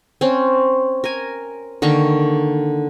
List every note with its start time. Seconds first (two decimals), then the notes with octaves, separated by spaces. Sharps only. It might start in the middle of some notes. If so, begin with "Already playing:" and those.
0.21 C4 C#4
1.04 A#4 G#5
1.82 D3 D#3 A#3 C#6